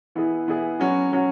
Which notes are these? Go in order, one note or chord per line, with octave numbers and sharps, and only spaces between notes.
E3 B3 E4 G#4
E3 B3 E4 G#4
F#3 C#4 F#4
F#3 C#4 F#4